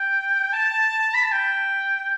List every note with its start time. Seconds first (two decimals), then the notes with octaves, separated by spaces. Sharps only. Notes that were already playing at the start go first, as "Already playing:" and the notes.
Already playing: G5
0.53 A5
1.14 B5
1.24 A5
1.32 G5